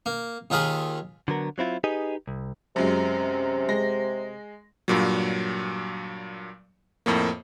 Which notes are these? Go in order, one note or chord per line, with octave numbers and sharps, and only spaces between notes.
A#3
D#2 D#3 F4 G#4 B5
D3 F#3 B3 A#4
F#3 C4 E4 F4
D#4 G4 G#4 B4 D#5
C2
F#2 C3 F#3 G#3
G#3 A#6
G2 A#2 F#3
F2 A2 A#3